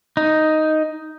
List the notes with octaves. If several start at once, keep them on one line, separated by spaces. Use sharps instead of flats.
D#4